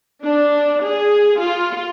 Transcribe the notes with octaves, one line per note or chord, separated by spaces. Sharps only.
D4
G#4
F4